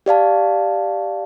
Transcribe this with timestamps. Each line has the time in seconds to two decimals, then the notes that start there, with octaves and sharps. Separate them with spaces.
0.06 G4 D5 F5 A5